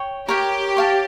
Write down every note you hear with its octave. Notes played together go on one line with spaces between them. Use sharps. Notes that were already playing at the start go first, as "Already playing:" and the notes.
Already playing: C#5 G5 C#6
G4 A#4 C#5 G5
C#5 F5 A5